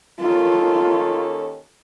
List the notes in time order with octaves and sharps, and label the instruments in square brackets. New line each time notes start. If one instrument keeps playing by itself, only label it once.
[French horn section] D#2 D#3 A#3 C#4 A4 [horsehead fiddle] F4